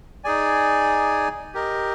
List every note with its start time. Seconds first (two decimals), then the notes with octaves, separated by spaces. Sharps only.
0.24 D#4 G#4 D5 G#5
1.54 G4 A#4 D#5